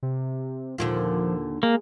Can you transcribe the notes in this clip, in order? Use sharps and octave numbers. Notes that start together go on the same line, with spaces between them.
C3
D#2 A#2 D3 F3
G#3 A#3